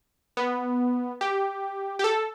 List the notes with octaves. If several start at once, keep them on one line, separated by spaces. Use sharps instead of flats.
B3
G4
G4
A4